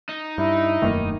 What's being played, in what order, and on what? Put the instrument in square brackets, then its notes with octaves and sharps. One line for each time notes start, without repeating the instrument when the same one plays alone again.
[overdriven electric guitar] D#4
[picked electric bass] G2 [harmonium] E4
[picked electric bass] E1 F#2 A3 [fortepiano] D#3 A#3